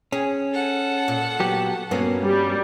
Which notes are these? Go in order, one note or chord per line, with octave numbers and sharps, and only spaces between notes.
C#4 G#4
A4 F#5
A#2
F#3 B3 G4
G2 F#3 A#3 B3 C#4
G3